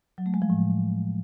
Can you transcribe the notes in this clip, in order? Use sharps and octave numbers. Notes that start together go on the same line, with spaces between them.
F#3
A3
G#3
F3
A2